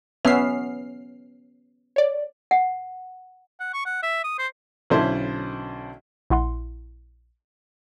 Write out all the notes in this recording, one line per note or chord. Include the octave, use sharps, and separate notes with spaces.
B3 C#4 E5 F6 C7
C#5 D5
F#5
F#5
C#6
F#5
E5
D#6
C5
B1 D3 C#4 E4 C5 A5
A#1 E4 F#5 C6